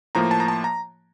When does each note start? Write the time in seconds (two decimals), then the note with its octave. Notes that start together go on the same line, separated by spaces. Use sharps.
0.15 A2 F3 A#3 A#5
0.31 A5
0.40 A#5
0.48 A5
0.64 A#5